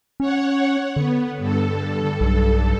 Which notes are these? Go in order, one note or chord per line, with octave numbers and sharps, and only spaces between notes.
C#4 C#5 F#5
D3 B3
G2 A4
B1